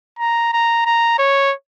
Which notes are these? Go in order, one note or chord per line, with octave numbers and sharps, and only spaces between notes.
A#5
A#5
A#5
C#5